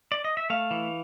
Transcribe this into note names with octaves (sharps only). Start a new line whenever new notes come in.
D5
D#5
E5
A3 F5
E3